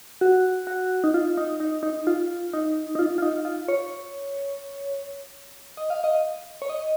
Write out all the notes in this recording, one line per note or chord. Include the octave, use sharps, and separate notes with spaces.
F#4
F#4
D#4
F4
D#4
D#4
D#4
F4
D#4
D#4
F4
F4
D#4
F4
C#5
D#5
F5
D#5
C#5
D#5